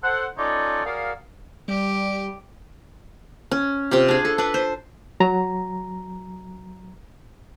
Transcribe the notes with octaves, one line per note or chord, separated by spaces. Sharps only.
A4 C5 F#5
C#4 D#4 F4 A4 C#5 D5
F#4 G#4 A#4 D5 F5
G3 G4
C#4
C3 F4 G4
D4 G#4
A4
D4 B4
C5
F#3 A#5